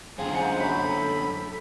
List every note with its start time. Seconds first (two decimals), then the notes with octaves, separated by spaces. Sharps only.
0.18 F#2 D3 C4 F4 G#4 F5
0.35 G#2 G#3 C5 F#5
0.60 F#3 A3 B5
0.83 A4
1.36 A4